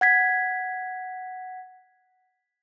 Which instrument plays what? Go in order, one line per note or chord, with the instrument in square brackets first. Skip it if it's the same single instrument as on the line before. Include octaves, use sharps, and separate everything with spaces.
[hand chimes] F#5 G#6 B6